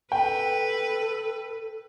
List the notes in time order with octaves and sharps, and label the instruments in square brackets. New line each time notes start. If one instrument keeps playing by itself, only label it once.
[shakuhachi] A4 [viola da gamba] B4 [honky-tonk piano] G5